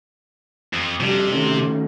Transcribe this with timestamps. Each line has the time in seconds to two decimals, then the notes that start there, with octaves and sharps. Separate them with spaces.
0.73 F2
1.00 F2 C3 G3
1.32 D#3 A3 C#4